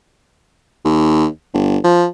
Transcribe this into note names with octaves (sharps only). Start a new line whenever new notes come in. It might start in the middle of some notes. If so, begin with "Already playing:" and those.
D#2
G1
F3